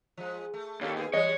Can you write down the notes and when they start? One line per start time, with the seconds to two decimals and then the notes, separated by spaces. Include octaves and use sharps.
0.17 F3 G#3
0.54 A3
0.81 D#2 C#4 D#4 A4
0.97 B3 G#4
1.13 E3 G3 G#3 C#5 D#5